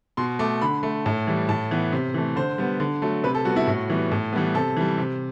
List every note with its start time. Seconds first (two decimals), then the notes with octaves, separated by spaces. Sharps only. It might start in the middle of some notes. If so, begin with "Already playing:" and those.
0.17 B2 C6
0.39 A3 D6
0.61 D3 B5
0.83 A3
1.06 A2
1.27 E3 G3
1.49 A2 A5
1.71 E3 B3
1.92 C3
2.14 E3 A3
2.36 D3 C5
2.58 G3 B3
2.80 D3
3.02 F#3 A3
3.24 C3 B4
3.35 A4
3.45 G3 B3 F#4
3.56 E4
3.67 A2 F#4
3.90 E3 G3 B3
4.12 A2
4.33 E3 G3 B3
4.55 C3 A4
4.76 E3 G3
4.98 C3